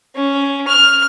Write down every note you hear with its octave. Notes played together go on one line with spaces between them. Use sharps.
C#4
F6